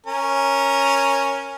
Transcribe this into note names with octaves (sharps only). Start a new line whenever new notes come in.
C#4 A#4